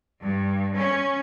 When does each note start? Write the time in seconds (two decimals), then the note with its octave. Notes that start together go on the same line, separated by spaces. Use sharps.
0.23 G2
0.76 C#4